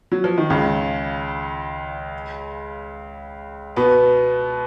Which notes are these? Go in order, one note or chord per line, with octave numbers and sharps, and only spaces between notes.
F#3
F3
D#3
C#2 C#3
B2 B3